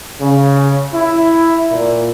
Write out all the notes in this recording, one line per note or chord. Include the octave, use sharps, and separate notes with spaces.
C#3
E4
A#2